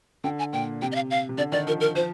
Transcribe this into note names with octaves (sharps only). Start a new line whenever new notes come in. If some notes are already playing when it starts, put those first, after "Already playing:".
D3 G5
G#5
A#2 G5
C3 G5
D#5
F5
F5
C3
D3 D5
D#3 D5
F3 A#4
A#4
F3 C5